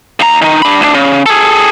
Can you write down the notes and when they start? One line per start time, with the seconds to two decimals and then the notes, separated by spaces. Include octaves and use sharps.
0.20 D#2 A#5
0.42 D#3 D#4
0.62 D4 B5
0.80 D2 D4
0.94 C#3
1.26 G#4 A4